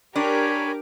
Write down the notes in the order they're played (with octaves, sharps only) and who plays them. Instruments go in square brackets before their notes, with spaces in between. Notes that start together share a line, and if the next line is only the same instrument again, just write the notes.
[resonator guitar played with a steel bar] D4 [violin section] G4 A#4 D6 [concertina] C#5 G#5 B5